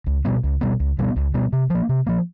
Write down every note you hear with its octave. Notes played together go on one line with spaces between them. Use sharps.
C#2
B2 G3 B3
C#2
B2 G3 B3
C#2
B2 G3 B3
C#2
B2 G3 B3
C3
F3 A#3
C3
F3 A#3